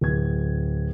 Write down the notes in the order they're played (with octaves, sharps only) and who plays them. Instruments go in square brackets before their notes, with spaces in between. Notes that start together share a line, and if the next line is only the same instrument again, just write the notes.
[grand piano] D1 G#6